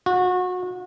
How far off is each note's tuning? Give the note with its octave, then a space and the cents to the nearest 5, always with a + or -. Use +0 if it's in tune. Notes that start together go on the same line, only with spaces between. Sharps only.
F#4 -30